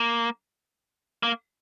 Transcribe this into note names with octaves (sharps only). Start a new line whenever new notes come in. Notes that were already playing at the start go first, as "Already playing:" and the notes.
Already playing: A#3
A#3